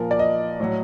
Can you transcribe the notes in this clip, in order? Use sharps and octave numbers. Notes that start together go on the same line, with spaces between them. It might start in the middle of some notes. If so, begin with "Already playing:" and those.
Already playing: A#2 F3 A#4
D5
D#5
A2 F#3